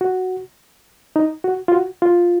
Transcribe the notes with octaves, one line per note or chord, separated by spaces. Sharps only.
F#4
D#4
F#4
F4
F#4
F4